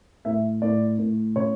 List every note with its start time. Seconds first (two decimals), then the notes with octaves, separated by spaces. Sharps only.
0.25 A2 E5
0.62 A2 D5
0.98 A2
1.36 C#3 C#5